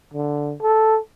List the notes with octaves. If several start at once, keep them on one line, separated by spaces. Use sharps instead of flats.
D3
A4